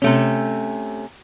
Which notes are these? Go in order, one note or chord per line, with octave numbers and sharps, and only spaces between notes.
C3 A3 C#4